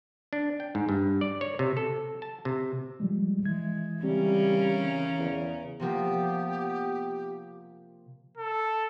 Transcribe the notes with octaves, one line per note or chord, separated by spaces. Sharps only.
D4
G5
G#2
G2
D5
C#5
C3
A4
A5
C3
F3 G3 G#3
E3 G#3 G#6
C#3 G3 C4 C#4 A#4
E2
C3 F3 A#3 B3 G4
A4